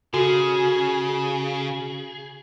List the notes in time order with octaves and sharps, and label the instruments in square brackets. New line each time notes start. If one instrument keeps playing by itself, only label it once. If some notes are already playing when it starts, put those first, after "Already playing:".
[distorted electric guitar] C#3 [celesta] F#4 A4 [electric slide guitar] G#4